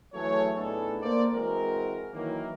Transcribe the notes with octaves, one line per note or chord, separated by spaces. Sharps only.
E3 F#3 A3 G#4 A4 C#5
A2 B3 D4 D#4 G#4 A4
A#3 C5 D5
E3 G#3 C4 F#4 A#4
D#3 E3 F#3 A#3